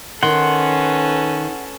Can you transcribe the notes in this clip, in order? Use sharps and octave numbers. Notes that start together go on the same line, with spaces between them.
D#3 C#4 A4 B4 F#5 C6